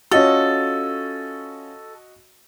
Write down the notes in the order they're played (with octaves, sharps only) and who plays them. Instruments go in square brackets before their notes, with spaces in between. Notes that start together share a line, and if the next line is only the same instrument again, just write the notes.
[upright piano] C#4 F4 [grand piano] F#4 D#5 [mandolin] A4